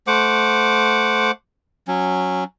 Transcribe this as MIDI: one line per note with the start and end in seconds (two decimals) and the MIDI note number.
0.07 1.31 57
0.07 1.31 72
0.07 1.31 78
0.07 1.31 86
1.88 2.44 54
1.88 2.44 61